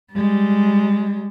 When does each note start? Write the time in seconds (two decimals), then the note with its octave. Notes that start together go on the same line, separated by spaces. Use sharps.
0.13 G3 G#3